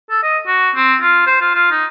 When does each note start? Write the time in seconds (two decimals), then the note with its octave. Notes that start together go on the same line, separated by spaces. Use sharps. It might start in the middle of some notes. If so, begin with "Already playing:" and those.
0.11 A4
0.23 D#5
0.47 F#4
0.76 C4
1.01 F4
1.27 C5
1.41 F4
1.55 F4
1.71 D#4